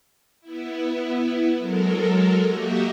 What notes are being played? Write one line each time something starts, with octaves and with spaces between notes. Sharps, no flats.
B3 E4
F#3 G#3 A4 A#4
A#3 F#4 G4 D#5 E5